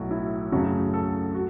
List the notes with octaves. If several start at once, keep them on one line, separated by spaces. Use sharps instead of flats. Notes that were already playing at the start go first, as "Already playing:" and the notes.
Already playing: B1 A2 F#3 F#4
E4
F#2 C#3 F#3 A3 F#4
A4
F#4